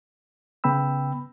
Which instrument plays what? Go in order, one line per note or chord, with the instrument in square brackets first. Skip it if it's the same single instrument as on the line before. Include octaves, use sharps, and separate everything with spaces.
[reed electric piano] C#3 B3 G5 B5 E6